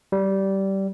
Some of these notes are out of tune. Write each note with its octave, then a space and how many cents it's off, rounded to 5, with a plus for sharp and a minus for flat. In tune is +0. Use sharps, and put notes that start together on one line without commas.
G3 -15